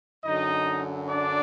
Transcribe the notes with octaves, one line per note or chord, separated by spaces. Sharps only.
F#2 D3 F#3 D#4 D#5
D4 D5